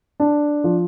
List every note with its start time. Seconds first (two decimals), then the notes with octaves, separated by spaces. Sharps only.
0.20 D4
0.64 F3